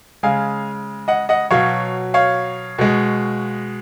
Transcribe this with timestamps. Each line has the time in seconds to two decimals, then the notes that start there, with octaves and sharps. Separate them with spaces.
0.23 C#3 G#3 F5 G#5
1.08 D#5 F#5
1.29 D#5 F#5
1.51 B2 F#3 C#5 F5
2.14 C#5 F5
2.78 B2 G#3